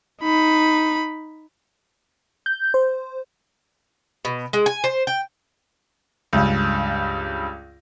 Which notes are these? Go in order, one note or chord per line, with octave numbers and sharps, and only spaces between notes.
D#4 B5
G6
C5
B2
G#3
G#5
C5
G5
C#2 G2